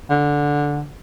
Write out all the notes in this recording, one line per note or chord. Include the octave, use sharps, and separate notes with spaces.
D3